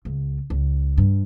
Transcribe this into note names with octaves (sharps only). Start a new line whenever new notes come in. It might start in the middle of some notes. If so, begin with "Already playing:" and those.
C#2
C#2
G2